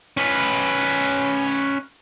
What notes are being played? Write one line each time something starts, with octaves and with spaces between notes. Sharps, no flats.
C#4 B4